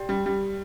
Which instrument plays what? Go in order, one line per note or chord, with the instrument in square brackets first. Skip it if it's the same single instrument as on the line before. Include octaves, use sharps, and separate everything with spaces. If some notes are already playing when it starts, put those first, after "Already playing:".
Already playing: [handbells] G4 D5 G5
[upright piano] G3
G3